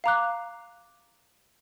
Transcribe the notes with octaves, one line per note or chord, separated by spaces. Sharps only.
F5 A#5 D6 F#6